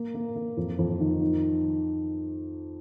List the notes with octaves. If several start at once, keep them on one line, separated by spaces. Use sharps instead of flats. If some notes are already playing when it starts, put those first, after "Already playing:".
Already playing: A#3
A#3
A#3
F2
F2
D#3
D#3